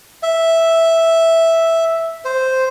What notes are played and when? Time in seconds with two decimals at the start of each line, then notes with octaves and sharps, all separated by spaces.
0.23 E5
2.25 C5